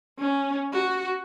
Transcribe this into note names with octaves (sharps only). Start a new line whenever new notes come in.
C#4
F#4